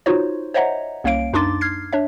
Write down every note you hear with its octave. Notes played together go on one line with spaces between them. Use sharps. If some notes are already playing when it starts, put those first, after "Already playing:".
D#4 F4 F#4 C5 C#5
C5 C#5 D#5 E5 F#5 A#5
C2 A#3 C#4 C#5 F5 D7
F#2 D4 D#4 C6 D6 A6
F6 G#6 C7
D4 C#5 E5